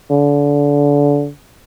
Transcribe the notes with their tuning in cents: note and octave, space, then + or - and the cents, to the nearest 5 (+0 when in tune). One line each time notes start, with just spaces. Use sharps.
D3 -30